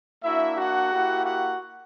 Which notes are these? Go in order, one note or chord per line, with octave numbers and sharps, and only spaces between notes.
A#3 D4 E4 F#4 E5
F#4 F#5
A#3 E4 G4
F#4 F#5